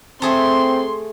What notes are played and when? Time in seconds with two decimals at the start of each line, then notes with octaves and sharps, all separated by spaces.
0.22 A3 C4 G#4 E5 C6